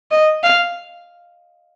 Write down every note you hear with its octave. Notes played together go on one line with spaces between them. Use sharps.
D#5
F5